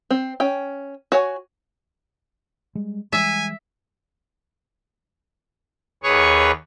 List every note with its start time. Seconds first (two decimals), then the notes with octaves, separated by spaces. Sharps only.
0.10 C4
0.40 C#4 G5
1.12 F#4 C#5 G#5
2.75 G3 G#3
3.13 E3 G3 G#3 E5 G#5
6.03 D#2 G#4 B4 C#5 C#6